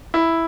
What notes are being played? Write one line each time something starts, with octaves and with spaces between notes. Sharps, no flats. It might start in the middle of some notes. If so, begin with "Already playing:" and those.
E4